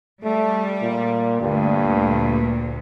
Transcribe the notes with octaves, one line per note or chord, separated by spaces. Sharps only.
G3 A3
A#2
D2 G2 A#2